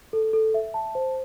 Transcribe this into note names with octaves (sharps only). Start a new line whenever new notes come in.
A4
A4
E5
A5
C5